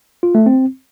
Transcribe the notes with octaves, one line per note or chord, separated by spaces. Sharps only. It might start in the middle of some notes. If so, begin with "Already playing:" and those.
F4
A3
C4